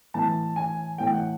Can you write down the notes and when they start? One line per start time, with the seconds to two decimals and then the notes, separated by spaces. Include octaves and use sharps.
0.14 A2 E3 A5
0.56 G#5
0.98 A2 E3 G5
1.11 F#5